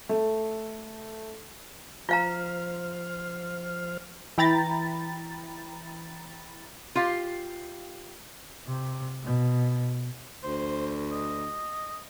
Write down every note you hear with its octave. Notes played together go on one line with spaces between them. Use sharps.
A3
F3 F4 C5 F5 A#5 F6
E3 E4 G5 A#5 B5 A6
F4 G4 F5
C3
B2
D2 C5
D#5